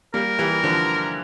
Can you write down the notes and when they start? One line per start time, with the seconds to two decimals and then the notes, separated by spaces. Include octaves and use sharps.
0.14 G3 A#3 A#4
0.39 E3 G3
0.63 D3 F3